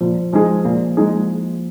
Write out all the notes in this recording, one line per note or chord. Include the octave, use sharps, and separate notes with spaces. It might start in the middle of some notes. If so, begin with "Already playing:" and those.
A#2 F3
F3 G#3 D#4 G#4
A#2 A#3
G#3 D#4 G#4